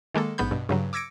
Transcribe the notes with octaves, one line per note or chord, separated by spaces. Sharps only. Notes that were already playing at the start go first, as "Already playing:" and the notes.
D#3 G#3 A#3 A4
A#1 G#2 B3 B5 G6
G2 B2
G2 C#3 F#3
D6 E6 G#6 A#6 C#7 D7